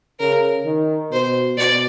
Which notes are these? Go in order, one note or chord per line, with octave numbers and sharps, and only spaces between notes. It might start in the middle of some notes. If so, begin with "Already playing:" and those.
C#3 A#4
D#3
B2 C5
B2 D5